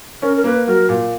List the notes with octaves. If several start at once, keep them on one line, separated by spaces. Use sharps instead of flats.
C#4 A#4
A#4
A#3 B4
F#3 A#4
A#2